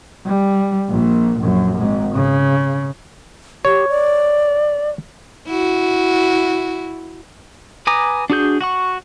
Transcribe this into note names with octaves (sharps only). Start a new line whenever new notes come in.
G3
A#1 A#2
A#1 F#2
G#1 G#2
C#3
G4 C#5
D5
E4 F#4
B4 G#5 A#5 D6 D#6
D4 F#4 G#4 G6
F#4 F#5 C#6